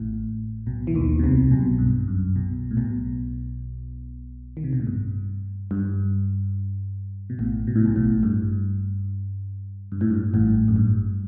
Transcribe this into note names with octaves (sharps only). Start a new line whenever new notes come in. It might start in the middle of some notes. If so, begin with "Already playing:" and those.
Already playing: A1 A2
B1 B2
E3
D#2 D#3
B2
C2 C3
B1 B2
G2
F#2
B1 B2
A2
B1 B2
D#3
C3
B2
A2
G2
G2
B2
A1 A2
B2
A2
B1 B2
A1 A2
G2
G2
A2
G2
A1 A2
F#2
G2